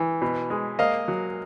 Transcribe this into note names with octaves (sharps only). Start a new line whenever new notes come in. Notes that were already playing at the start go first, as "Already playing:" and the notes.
Already playing: E3
B2
G#3
A#3 D#5 F5
F#3